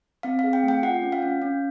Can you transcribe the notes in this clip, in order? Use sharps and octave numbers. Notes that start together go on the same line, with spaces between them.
C4 F5
G#4 F5
G5
A3 G5
F4 F#5
C#4
F5
C#4
C#4